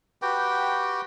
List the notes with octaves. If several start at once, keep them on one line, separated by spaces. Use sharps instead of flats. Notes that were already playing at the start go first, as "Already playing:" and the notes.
F#4 G4 B4 G5